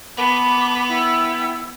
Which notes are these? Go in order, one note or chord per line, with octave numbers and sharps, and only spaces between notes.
B3 A5 B5 D6
E4 G5 E6